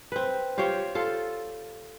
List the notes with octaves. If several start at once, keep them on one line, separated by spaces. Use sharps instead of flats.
C4 B4
F4 G4 C5 C#5
F4 A4